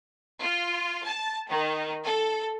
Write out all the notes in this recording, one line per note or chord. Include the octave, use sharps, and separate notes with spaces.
F4
A5
D#3
A4